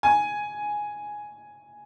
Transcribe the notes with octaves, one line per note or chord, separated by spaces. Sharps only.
G#5